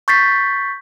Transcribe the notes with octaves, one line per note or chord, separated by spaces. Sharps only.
C#6 G6 A6 B6 C7